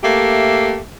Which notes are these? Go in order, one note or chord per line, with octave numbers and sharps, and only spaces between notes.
A3 A#3 G4 E5